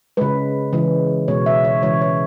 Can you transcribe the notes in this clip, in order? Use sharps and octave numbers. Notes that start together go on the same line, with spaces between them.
C#3 G#3 B4
C#3 E3 G#3
B2 G#3 C#5
E5
C#5
C#3 E3 G#3 C#5
C#5